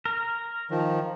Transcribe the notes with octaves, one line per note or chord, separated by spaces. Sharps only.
A#4
D#3 F3